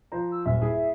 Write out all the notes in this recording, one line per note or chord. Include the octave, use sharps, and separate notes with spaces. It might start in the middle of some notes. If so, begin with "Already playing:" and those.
F3 C5 A#5
E6
D#1 F#2 E5
E4 G#4